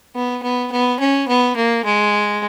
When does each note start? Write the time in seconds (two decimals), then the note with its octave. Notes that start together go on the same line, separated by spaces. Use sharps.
0.15 B3
0.43 B3
0.72 B3
1.00 C#4
1.28 B3
1.56 A#3
1.85 G#3